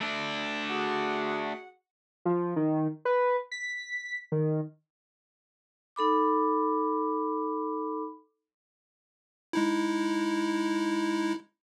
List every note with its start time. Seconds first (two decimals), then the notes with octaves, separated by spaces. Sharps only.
0.01 A3 D4
0.70 F#4 G#4 F#5
2.25 F3
2.56 D#3
3.05 B4
3.52 B6
4.32 D#3
5.96 D#4 A4 B5 D6
9.53 G#3 D#4 E4